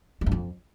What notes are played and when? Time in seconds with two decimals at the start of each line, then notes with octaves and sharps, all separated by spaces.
0.21 G3
0.26 G2
0.32 F2